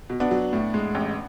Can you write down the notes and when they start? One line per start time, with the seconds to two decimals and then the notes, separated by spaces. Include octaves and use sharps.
0.10 B2
0.20 B3 D4
0.31 F#3
0.53 A2
0.74 G#3
0.95 A1